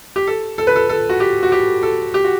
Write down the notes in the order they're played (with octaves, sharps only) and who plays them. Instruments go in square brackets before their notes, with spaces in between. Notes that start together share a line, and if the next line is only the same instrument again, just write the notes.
[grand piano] G4
A4
A4
B4
A4
A4
F#4
G4
F#4
G4
A4
G4
F#4